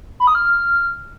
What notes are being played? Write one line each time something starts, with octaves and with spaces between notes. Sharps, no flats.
B5
D#6
F6